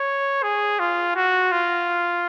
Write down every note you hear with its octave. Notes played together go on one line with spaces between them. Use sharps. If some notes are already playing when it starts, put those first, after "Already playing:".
Already playing: C#5
G#4
F4
F#4
F4